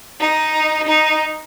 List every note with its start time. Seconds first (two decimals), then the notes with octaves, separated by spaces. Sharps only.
0.20 D#4
0.87 D#4